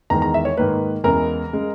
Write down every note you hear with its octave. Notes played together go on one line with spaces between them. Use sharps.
E2 D#3 G#3 A#5
A#5
E5
C#5
G#2 D#3 A#3 B4
E2 C#3 E3 G#3 A#4
C#3 G#3